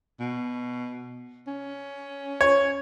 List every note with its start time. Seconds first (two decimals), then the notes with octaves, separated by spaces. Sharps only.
0.20 B2
1.47 C#4
2.41 C#5